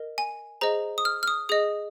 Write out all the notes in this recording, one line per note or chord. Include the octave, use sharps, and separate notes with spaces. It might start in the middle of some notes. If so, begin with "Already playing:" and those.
Already playing: A#4 D#5
G#5
G#4 C5 D#5 A#5
D#6
F6
F6
D#6
G#4 D#5 D#6